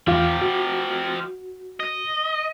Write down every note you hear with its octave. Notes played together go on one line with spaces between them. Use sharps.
E2 F3 F4 G4 F5
F#4
D#5